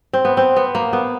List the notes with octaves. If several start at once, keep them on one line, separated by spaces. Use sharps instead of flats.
C4
B3
C4
B3
A#3
B3